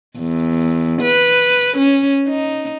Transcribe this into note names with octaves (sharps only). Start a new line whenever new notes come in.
E2
B4
C#4
D#4